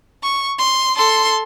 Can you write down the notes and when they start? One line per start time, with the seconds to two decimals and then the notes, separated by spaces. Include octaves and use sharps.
0.23 C#6
0.59 C6
0.96 A4 C6